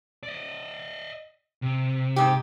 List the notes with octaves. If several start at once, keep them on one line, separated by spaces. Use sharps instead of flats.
D5 D#5
C3
G#2 G4